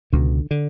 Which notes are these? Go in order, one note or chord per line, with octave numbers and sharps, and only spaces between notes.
C#2 B2 D3
D3